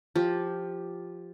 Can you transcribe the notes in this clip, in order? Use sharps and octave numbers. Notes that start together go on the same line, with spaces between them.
F3 G4